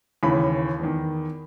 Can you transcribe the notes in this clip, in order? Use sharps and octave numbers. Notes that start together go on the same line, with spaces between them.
D#2 C#3 E3 B5
E2 D#3